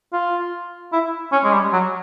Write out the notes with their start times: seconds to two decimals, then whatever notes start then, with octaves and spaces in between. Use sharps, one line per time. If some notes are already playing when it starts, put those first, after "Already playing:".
0.13 F4
0.93 E4
1.32 C#4
1.44 G#3
1.53 G3
1.73 F#3